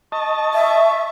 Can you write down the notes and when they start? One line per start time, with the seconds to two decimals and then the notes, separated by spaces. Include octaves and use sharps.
0.12 D#5 A5 C#6
0.54 E5